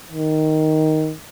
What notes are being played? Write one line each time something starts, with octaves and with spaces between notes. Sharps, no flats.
D#3